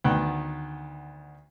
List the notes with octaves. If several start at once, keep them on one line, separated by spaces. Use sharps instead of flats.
D2 D#3 B3 G5 F#6